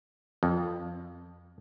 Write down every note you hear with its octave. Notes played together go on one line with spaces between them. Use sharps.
F2